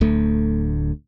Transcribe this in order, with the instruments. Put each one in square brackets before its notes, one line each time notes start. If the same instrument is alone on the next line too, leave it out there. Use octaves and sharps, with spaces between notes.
[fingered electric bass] D1 D2 A3